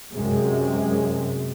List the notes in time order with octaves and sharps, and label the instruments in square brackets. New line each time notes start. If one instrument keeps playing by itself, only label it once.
[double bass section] F#2 C3 G#3